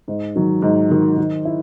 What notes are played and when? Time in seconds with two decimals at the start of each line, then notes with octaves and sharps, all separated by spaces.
0.08 G#2
0.36 D#3 F#3
0.62 G#2
0.90 D#3 F#3
1.17 D#3
1.45 E4